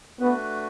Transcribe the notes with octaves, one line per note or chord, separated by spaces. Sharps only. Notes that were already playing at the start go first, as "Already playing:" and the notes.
A3 B3 D4 F#4 B4